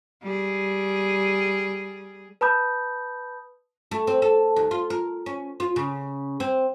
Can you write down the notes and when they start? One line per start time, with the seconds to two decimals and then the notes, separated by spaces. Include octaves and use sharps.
0.23 G3 G#4
2.41 B4 A5 B5 D#6 G6
3.91 A3
4.07 C4
4.22 A4
4.56 D#2
4.71 F4
4.90 A#4
5.26 C#4
5.60 F4
5.76 C#3
6.40 C4